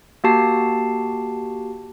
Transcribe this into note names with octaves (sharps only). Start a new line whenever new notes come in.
A#3 F#4 G4 A5 C7